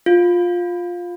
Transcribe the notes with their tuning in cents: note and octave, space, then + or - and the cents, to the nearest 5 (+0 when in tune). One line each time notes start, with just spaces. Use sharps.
F4 +10